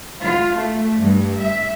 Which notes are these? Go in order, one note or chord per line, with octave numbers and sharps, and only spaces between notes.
F4
A3
G2
E5